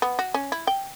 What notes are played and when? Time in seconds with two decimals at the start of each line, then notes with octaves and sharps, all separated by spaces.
0.02 B3
0.19 F#4
0.34 C#4
0.52 E4
0.67 G5